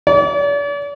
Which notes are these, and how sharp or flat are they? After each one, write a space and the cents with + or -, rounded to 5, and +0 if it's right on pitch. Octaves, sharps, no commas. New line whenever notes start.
D5 -45